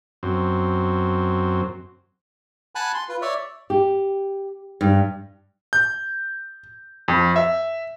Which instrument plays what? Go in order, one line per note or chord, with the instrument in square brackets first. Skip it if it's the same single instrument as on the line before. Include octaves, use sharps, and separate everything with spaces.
[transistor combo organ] F#2 C4
[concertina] F#5 G#5 A5 B5 F#6
C6
F4 B4
C#5 D5 E5
[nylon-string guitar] G4
G2
[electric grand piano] G6
F2
E5